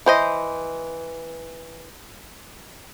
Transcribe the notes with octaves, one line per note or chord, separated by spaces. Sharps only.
E3 C5 D#5